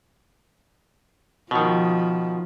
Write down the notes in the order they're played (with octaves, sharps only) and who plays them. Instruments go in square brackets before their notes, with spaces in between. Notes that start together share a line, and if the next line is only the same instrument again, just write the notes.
[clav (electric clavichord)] B2 D#3 [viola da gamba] F3